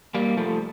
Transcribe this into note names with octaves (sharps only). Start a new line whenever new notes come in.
G3 A#3
F3 A3